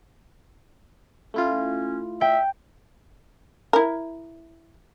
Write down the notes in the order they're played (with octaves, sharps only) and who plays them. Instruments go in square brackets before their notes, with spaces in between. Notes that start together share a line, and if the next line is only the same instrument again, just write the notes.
[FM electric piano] A3 E4 F4 [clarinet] C#4
[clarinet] E5 [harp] G5
[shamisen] E4 A#4